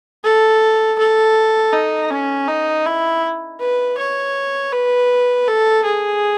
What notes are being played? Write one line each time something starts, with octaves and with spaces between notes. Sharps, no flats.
A4
A4
D#4
C#4
D#4
E4
B4
C#5
B4
A4
G#4